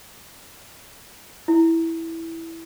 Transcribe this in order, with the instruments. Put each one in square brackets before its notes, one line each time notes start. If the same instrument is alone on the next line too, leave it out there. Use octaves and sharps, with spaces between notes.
[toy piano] E4